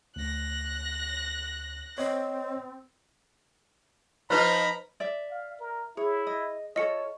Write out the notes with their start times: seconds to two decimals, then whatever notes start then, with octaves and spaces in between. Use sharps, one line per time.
0.16 D2 F#6 A#6
1.98 C4 C#5 D#5
4.30 F3 D#4 F4 B4 C5 A#5 B5
5.00 D5 E5
5.31 F5
5.60 A#4
5.97 E4 G#4 C#5
6.27 D#5
6.76 F4 A4 C#5 D#5 C#7